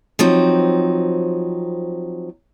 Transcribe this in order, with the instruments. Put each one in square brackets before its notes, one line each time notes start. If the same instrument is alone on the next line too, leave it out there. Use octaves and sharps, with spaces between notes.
[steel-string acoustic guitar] F3 F#3 C4 D#4